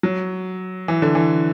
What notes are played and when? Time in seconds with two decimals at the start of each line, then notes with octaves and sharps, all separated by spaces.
0.03 F#3
0.88 E3
1.02 D3
1.15 E3